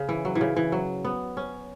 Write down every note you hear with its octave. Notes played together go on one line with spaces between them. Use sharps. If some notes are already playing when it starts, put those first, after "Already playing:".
Already playing: C#3
E3
F#3
E3
C#3
E3
F#3
B3
C#4